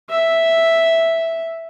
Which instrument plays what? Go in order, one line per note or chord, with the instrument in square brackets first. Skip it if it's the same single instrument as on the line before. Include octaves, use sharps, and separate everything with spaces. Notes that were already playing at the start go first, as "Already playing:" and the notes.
[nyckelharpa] E5